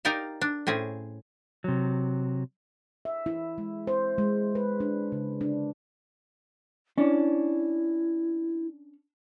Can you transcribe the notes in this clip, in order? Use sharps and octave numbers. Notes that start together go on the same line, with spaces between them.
D#4 G4 A#4 D5 F5
D4
A2 C4 C#4 G#4
C3 F#3
E5
E4
G#3
C5
G#3
B4
D4
C#3
D4
C#4 D4 E4